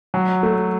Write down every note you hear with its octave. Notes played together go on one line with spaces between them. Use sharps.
F#3
A3